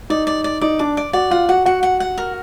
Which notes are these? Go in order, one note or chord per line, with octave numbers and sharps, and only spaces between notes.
D#4 D5
D5
D5
D#4 D5
D4 D6
D5
F#4 D5
F4 F#5
F#4 F#5
F#4 F#5
F#5
F#5
A#4